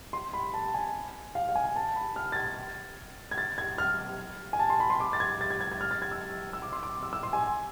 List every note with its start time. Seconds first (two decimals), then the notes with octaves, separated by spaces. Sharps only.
0.13 C6
0.33 B5
0.54 A5
0.74 G#5
1.35 F5
1.49 F5
1.55 G#5
1.76 A5
1.96 B5
2.16 F6
2.32 A6
2.36 G#6
3.31 G#6
3.38 A6
3.58 G#6
3.78 F6
4.53 G#5
4.59 A5
4.70 C6
4.80 B5
4.90 C6
5.00 D6
5.13 A6
5.20 G#6
5.41 A6
5.51 G#6
5.61 G#6
5.72 G#6
5.81 F6
5.91 A6
6.02 G#6
6.11 E6
6.53 E6
6.62 D6
6.72 C6
6.83 D6
7.03 E6
7.13 E6
7.23 C6
7.33 G#5